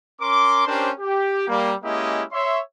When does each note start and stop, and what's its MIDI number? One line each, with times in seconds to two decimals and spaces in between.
0.21 0.66 61
0.21 0.66 70
0.21 0.66 84
0.21 0.66 86
0.67 0.91 61
0.67 0.91 62
0.67 0.91 67
0.67 0.91 70
0.67 0.91 72
0.99 1.44 67
1.48 1.74 55
1.48 1.74 58
1.84 2.23 56
1.84 2.23 58
1.84 2.23 61
1.84 2.23 64
1.84 2.23 67
1.84 2.23 75
2.32 2.59 73
2.32 2.59 76
2.32 2.59 84